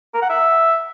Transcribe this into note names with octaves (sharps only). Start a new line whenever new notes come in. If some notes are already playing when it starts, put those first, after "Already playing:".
A#4
F#5
E5